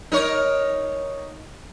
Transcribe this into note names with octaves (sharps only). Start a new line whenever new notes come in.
D#4 A#4 C#5